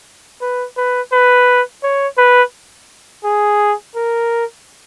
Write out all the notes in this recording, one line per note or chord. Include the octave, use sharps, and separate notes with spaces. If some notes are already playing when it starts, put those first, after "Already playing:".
B4
B4
B4
C#5
B4
G#4
A#4